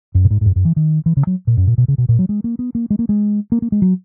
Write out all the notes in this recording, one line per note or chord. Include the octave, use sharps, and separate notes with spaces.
F#2
A#2
G#2
G#2
F#2
F#2
E3
D#3
E3
C#3
F#3
A#2
F#2
A#2
B2
C#3
B2
A#2
F#3
G#3
A#3
B3
A#3
G#3
A#3
G#3
A#3
A#3
G#3
F#3